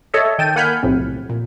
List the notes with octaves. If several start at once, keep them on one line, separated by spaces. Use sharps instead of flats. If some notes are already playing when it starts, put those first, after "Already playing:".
A4 C#5 D#5 E5
D#3 G5 A5 D#7
A#3 F#5 G#5 B5 F6 G6
B1 F2 A2 C3
A#2